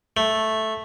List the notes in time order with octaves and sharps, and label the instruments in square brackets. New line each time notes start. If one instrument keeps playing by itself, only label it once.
[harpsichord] A3